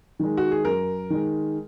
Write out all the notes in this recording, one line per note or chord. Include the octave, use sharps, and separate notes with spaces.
D#3 G#3
F#4
G#4
F#2 A#4
D#3 G#3